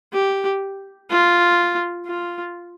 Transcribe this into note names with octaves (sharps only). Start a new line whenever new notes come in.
G4
F4
F4